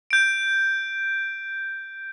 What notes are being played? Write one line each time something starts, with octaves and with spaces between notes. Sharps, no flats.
G6 D7